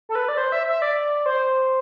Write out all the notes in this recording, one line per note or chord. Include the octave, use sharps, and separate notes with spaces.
A4
B4
D5
C5
E5
E5
D5
C5